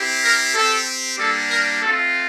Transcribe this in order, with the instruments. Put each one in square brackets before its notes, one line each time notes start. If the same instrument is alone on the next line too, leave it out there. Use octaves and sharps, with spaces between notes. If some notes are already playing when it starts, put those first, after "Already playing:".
Already playing: [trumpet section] C4 E4 G4
A#4
C4 G4 A4
G3 A#3 D4 G4 A4
A#4
A3 C4 F4 A4